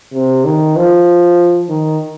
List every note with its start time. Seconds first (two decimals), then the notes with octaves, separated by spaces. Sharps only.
0.13 C3
0.45 D#3
0.76 F3
1.69 D#3